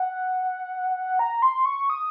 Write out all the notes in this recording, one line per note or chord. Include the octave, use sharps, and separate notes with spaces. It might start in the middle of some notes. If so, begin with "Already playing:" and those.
Already playing: F#5
F#5
A#5
C6
C#6
D#6